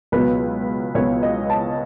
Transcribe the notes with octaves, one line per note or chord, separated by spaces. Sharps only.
C#2 B2 F#3 B3 B4
C#2 B2 F#3 B3 C#5
D#5
A5